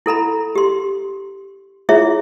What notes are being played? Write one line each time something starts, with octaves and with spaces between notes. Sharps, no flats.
E4 A4 A#5 B5
G4 C6
E4 F4 G#4 C#5 E5